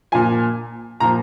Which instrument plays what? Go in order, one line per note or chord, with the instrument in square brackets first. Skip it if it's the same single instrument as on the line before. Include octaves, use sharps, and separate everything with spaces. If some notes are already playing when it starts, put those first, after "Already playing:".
[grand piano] A#2 F3 G#5
A#2 F3 A#5